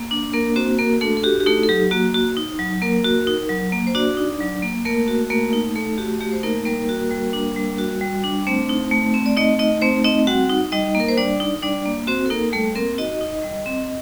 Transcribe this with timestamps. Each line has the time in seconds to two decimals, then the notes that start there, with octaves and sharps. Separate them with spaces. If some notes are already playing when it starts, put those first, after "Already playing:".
Already playing: A#3
0.11 D4
0.33 A#3 A#4
0.56 C4 F#4 C5
0.78 A#3 A#4
1.01 A3 D4 A4
1.17 A4
1.24 F#4 G4
1.40 G4
1.46 A3 D#4 A4
1.64 A4
1.69 F#3 G4
1.91 A#3 F#4
2.14 F#4
2.37 D#4
2.59 F#3
2.82 A#3 A#4
3.04 F#4
3.27 D#4
3.49 F#3
3.72 A#3
3.87 C5
3.95 D4 F#4 D5
4.17 D#4
4.40 F#3
4.63 A#3
4.85 A3 A#3 A#4
5.08 F#4
5.30 A3 A#3 A#4
5.53 D#4
5.75 A3 A4
5.98 F#4 G4
6.21 A3 G4
6.32 C5
6.43 A#3 D#4 A#4
6.65 G3 A#3 A#4
6.89 F#4
7.11 G3
7.33 D4
7.56 G3
7.79 F#4
8.01 G3
8.24 D4
8.47 A3 C4 C5
8.69 D#4
8.91 A3
9.14 C4
9.26 D5
9.37 A3 D#4 D#5
9.59 D#4 D#5
9.82 A3 C4 C5
10.04 C4 D#4 D#5
10.27 G3 F#4 F#5
10.49 D#4
10.72 G3 D#4 D#5
10.95 A#3
11.00 A#4
11.08 C5
11.17 G3 D4 D5
11.40 D#4
11.63 G3 D4 D5
11.86 A#3
12.07 C4 F#4 C5
12.26 A4
12.30 A#3 D#4 A#4
12.53 G3 A3 A4
12.75 A#3 C4 A#4
12.98 D#4 F#4 D#5
13.21 D#4
13.44 G3
13.66 C4